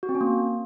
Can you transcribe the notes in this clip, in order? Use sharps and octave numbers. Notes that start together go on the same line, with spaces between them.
F#4
C4
C#4
A#3